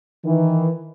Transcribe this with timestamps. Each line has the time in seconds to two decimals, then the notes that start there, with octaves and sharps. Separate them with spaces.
0.25 D#3 E3